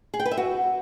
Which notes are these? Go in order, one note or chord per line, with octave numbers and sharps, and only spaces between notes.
G#4
G5
B4
E5
F#4